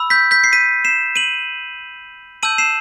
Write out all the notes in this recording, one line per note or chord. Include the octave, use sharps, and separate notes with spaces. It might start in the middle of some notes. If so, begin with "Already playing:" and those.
Already playing: B5 E6
G6 B6
G6 B6
C7
B6 D#7
C7 E7
D#7 F#7
A5 E6 G6 D#7 F#7
C7 E7